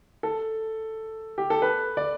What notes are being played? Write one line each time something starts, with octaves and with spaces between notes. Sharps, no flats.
A4
G4
A4
B4
D5